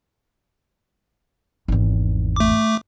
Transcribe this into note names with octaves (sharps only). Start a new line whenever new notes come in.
G#1 E2
A3 D6